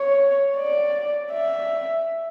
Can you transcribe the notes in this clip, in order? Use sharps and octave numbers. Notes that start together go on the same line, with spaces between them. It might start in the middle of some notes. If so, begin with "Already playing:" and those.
Already playing: C#5
D5
E5